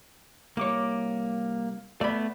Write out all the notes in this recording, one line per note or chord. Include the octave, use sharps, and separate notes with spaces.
C2 A#3 C#5 D6
A3 B3 D5 B5